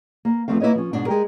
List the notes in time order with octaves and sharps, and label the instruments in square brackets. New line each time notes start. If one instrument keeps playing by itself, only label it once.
[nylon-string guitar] A#3
E2 F3 A3 C4 F5
A#3 E4 B4 C#5 D#5
F3 C#4
G#2 B2 D4
G#3 G4 A#4